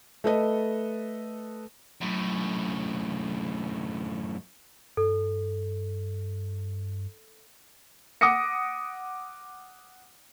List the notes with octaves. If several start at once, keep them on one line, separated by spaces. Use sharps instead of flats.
A3 A4 B4 D#5
F#2 A2
G2 A4
F#5 D6 D#6 A#6 C#7